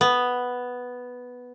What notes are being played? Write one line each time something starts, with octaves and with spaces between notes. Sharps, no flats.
B3